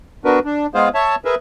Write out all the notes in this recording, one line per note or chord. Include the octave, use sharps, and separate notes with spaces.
B3 D4 F#4 A#4 B4
D4
G#3 B3 F4 G#4 C5 F5
C#5 E5 A5
G#4 A#4 B4 E5